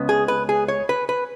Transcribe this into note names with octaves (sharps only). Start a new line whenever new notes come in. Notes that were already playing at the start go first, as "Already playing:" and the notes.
Already playing: C#2 C#3 B3
G#4
B4
G#4
C#5
B4
B4